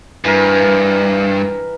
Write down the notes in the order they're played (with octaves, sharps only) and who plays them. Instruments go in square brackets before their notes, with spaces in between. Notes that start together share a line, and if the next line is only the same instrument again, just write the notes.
[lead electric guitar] G2 [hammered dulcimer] E3 A#4